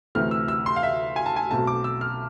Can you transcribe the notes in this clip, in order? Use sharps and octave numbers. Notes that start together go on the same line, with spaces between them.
D2 C3 E3 A3 C4 F6
E6
E6
C6
F5
E5
G#5
A5
G#5
B1 B2 A3 C4 A5
D6
E6
F6